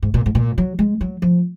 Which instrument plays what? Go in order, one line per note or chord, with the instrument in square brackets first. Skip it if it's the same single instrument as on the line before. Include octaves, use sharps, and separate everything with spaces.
[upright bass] G#2
A#2
G#2
A#2
F#3
G#3
F#3
F3